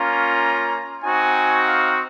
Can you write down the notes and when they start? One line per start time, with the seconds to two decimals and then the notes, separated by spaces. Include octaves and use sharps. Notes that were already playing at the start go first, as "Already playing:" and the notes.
Already playing: A#3 C#4 F4 A#5
1.03 C4 D#4 F#4 G#5
1.65 F5